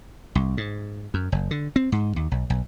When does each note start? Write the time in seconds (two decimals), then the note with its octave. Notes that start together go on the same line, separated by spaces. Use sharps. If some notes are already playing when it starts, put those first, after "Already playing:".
0.35 C2
0.57 G#2
1.14 F#2
1.32 F#1
1.51 D3
1.76 C4
1.92 G#2
2.16 D#2
2.31 B1
2.50 B1